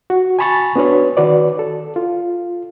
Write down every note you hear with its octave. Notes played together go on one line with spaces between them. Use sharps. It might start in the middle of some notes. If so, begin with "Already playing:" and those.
F#4
G#5 A5 B5 C#6 A6
B3 D4 F#4 B4 C#5
D#3 F#4 B4 D5
A4
F4